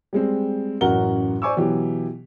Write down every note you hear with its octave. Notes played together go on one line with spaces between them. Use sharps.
G3 G#3 C4
A1 F#2 F#4 A#4 F#5 G7
C5 D5 G#5 C#6 D6 E6
B2 E3 F#3 G4